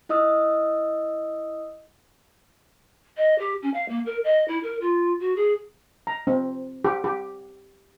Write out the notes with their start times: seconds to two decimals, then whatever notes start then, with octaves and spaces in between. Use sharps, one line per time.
0.09 E4 D#5 D#6 E6
3.17 D#5
3.39 G4
3.62 C#4
3.74 F5
3.89 A#3
4.06 A#4
4.24 D#5
4.48 E4
4.63 A#4
4.81 F4
5.20 F#4
5.36 G#4
6.07 A#5
6.27 C4
6.84 G4
7.04 G4